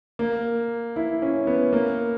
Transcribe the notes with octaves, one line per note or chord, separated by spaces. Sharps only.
A#3
E4
C#4
B3
A#3